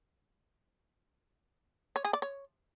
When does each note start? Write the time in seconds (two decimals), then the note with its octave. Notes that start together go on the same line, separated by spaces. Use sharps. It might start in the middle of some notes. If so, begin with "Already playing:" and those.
1.96 C#5
2.05 G#4
2.13 D5
2.22 C#5